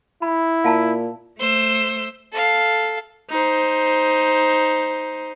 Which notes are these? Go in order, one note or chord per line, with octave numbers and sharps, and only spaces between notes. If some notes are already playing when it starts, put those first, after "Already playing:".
E4 B5
A#2 F5 A5 A#5
A3 C5 E6
A4 F5
D#4 C5